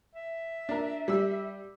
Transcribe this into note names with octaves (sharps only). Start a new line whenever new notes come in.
E5
D4 A#4
G3 E6